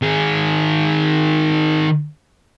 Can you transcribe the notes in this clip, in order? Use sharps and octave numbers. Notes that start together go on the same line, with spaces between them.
D#3 G#4